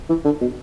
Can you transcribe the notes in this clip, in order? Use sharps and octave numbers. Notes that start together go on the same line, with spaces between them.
E3
D3
B2